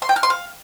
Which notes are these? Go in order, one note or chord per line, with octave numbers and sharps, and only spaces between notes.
C6
G5
F6
C6
F5